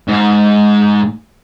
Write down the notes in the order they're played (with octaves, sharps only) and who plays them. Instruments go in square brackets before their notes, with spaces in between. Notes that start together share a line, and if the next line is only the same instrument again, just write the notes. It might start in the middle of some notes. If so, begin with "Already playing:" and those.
[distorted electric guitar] G#2 G#4